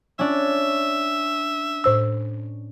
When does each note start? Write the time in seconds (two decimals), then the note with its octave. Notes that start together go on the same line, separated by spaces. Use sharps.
0.19 C#4 D4 E5
1.84 A2 C5 E6